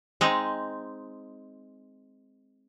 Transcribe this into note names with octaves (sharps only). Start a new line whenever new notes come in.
G#3 C4 D#4